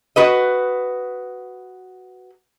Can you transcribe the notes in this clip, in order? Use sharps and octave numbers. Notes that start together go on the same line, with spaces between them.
F#4 B4 D#5